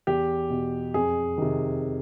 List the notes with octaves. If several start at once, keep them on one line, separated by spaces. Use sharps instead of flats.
E2 G4
B2
F2 G#4
C3 D#3